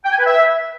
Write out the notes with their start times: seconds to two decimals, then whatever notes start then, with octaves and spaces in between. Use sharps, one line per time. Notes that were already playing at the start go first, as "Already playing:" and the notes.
0.05 G5
0.12 G#5
0.19 B4
0.26 E5